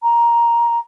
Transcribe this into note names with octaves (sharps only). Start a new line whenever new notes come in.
A#5